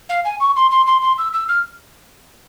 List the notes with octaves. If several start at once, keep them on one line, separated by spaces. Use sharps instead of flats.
F5
G#5
C#6
C6
C6
C6
C6
E6
E6
F6